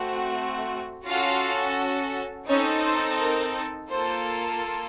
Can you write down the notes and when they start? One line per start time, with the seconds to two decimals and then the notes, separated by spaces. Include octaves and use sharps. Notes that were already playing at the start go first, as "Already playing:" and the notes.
Already playing: A3 C4 F#4
1.06 C#4 F4 F#4 A4 F5
2.48 C4 C#4 D#4 A4 C#5
2.85 C5
3.19 A#4
3.90 A#3 F4 A4 C5